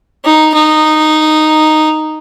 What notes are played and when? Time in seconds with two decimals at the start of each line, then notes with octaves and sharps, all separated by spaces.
0.25 D#4
0.54 D#4